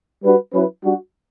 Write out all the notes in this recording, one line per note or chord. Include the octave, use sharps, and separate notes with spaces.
G3 D4 F#4 B4
F#3 C#4 E4 B4
G3 D4 F#4